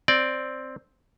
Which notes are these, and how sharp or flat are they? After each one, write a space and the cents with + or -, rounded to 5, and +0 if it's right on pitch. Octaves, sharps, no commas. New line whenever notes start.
C4 +0 D5 +0